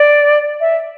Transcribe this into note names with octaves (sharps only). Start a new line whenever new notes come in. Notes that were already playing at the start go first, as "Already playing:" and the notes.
Already playing: D5
E5